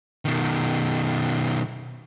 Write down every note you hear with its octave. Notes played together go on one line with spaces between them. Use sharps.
B2 D#3